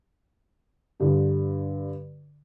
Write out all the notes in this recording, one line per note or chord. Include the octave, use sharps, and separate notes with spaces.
G2 D3